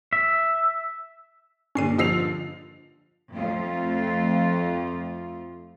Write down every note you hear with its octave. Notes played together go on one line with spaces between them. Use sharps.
E5
G2 A#2 D3 C#4 C7 D#7
F3 D#5 E6 C7 F7
F2 A3 F4